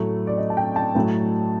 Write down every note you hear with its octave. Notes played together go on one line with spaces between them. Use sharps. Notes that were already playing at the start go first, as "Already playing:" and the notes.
Already playing: A2 F#3 A3
D5
D#5
A5
G5
A5
A2 F#3 A3